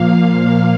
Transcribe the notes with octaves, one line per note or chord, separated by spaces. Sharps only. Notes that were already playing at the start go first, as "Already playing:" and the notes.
Already playing: A#2 F3 A#3 F5